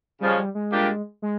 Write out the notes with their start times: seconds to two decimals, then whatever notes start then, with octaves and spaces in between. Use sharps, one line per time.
0.21 C#3 F3 G3 G#3 C#4
0.37 G3
0.55 G#3
0.71 A#2 G3 A#3 D4 G4
1.22 G#3